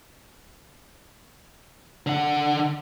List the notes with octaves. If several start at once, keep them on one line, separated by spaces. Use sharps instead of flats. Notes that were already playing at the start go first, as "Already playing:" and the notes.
D3 F#5